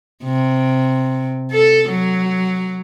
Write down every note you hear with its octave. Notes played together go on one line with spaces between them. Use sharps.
C3
A4
F#3